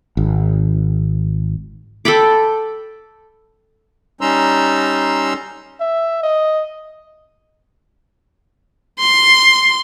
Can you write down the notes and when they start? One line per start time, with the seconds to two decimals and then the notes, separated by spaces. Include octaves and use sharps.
0.17 G#1
2.05 A4 G5 B5 D6
4.21 G3 C#4 D#4 A#5 C6 E6
5.80 E5
6.23 D#5
9.00 C6